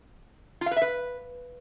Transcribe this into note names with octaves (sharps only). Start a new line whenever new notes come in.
F4
F5
B4
E5
B4